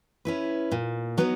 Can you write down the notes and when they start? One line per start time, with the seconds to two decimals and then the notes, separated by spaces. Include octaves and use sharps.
0.25 C#4 E4 B4
0.72 A#2
1.18 F#3 B3 D#4